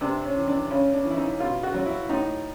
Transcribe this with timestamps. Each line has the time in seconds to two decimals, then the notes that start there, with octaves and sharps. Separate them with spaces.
0.01 C3 D4
0.24 C#4
0.37 E3
0.48 D4
0.70 C#3 C#4
0.94 D4
1.05 E3
1.10 E4
1.17 D#4
1.40 B2 F4
1.63 F#4
1.74 F#3
1.86 E4
2.09 A2 D#4